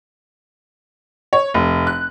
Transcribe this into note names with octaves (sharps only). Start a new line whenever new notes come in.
C#5
F1
F#6